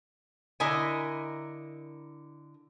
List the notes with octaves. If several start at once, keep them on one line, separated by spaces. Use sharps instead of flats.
D3 E4 A#4 D#5 G#5